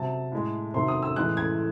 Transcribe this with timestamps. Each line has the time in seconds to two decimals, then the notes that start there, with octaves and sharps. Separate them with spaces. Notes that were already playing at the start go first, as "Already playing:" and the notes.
Already playing: C3 F#3 A5
0.32 A2 G#3
0.74 C3 D#3 F#3 C6
0.88 D#6
1.02 E6
1.16 A2 E3 G#3 F#6
1.37 G#6